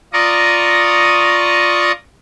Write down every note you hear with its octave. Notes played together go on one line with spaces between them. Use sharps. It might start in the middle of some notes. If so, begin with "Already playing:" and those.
F4 D5 D#5 A#5 C#6 D#6